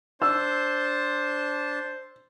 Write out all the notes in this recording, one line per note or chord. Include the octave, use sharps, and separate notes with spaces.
D4 C5 A5 E6